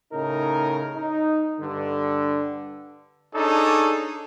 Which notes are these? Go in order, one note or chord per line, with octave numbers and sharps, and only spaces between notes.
A2 C#3 D#4 A#4
D#4
G2 D3
D4 D#4 G#4 A4 C#5